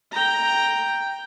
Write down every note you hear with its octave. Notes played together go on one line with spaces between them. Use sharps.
G5 A#5